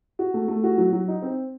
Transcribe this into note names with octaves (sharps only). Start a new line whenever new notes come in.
F#4
A3
A3
F#4
F#3
F#3
D#4
C4